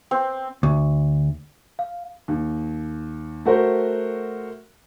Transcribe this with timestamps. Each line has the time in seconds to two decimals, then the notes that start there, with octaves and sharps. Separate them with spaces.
0.11 C4
0.63 D2
1.79 F5
2.28 D#2
3.45 A3 F#4 A#4 C5